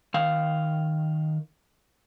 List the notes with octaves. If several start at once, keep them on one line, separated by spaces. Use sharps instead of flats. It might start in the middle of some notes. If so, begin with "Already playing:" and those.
D#3 F5